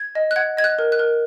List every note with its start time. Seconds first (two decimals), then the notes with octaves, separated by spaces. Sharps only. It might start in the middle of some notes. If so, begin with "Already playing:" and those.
Already playing: G#6
0.15 D#5
0.31 F#6
0.36 F#5 G#6
0.57 D#5 G#6
0.64 F#6
0.79 A#4
0.92 F#6
0.99 A#4